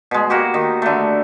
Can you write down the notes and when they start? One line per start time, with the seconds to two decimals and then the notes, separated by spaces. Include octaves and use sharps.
0.11 B2 G#3
0.30 A#3 F#4 G4
0.54 D#3
0.82 D3 A3